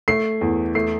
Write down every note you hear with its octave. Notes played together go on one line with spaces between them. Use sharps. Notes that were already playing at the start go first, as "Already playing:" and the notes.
A3 C7
E2
A3 C7